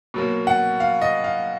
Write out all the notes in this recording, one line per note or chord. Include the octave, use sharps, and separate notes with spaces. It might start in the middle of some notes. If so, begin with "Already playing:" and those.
B2 F#3 A#3
F#5
F5
D#5
F5